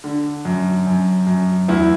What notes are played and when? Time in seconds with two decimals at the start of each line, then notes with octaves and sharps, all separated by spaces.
0.04 D3
0.45 F#2
0.87 F#2
1.27 F#2
1.68 E2 E4